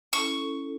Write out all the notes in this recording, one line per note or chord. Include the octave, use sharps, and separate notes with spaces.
C#4 E4 A4 C#6